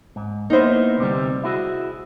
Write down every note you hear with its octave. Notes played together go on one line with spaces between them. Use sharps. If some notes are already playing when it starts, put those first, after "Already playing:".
G#2
A#3 B3 D#4 E4 C5
D2 C3 G3
E4 F#4 G#4